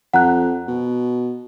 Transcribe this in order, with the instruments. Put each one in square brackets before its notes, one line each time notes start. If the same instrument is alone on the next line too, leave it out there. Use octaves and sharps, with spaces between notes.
[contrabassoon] F2 [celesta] F#5 A#5 F#6
[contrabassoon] B2